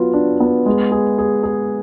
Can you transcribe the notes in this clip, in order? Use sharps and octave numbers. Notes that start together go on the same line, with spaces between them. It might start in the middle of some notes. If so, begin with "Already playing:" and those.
Already playing: F#3 B3 F4
D4
B3
G#3
G#4
G#4
G#4